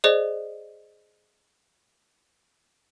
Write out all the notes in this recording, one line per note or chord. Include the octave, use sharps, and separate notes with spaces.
G#4 C5 D5 D#5